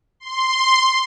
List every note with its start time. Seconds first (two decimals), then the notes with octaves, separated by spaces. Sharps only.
0.20 C6